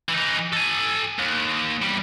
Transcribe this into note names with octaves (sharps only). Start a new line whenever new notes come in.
E3 D#4
A4 G#5
D#2
E2 G3